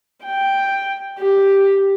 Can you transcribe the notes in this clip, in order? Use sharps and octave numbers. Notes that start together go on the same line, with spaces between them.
G5
G4